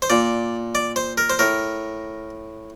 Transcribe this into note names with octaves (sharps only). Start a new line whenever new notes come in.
C5
A#2 D5
D5
C5
A#4
C5
A2 A#4